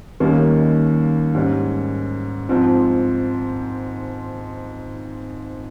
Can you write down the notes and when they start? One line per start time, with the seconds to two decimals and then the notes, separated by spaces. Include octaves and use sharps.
0.20 D#2 D#3 G3 A#3 C#4
1.35 G#2 G3 C#4
2.49 G#2 F3 C4